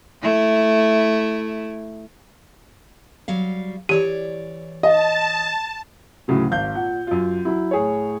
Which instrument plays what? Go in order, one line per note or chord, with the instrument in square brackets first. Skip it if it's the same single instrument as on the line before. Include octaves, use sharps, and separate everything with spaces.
[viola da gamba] A3 E4
[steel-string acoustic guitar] F#3 G3 F5
[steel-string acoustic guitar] E3 C#5 D5 [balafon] G4
[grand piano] D#5 [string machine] A5
[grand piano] D2 A2 C#3 F#3
G#1 F5 G6
A#2 F#5
F#2 F4
F#3 E4
A2 G#4 C#5